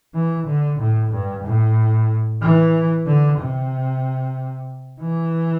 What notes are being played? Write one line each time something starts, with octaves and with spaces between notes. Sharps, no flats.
E3
D3
A2
G2
A2
E3
D3
C3
E3